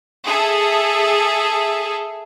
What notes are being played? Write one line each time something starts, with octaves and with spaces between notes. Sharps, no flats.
G#4 A4 E5